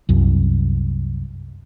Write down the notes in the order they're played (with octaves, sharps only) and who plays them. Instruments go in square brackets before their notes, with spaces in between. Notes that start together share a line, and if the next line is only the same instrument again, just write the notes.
[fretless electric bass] C2 F#2